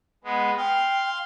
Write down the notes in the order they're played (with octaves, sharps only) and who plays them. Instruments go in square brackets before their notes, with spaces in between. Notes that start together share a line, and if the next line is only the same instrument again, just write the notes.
[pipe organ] G#3 B3
[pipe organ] F5 C6 [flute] G5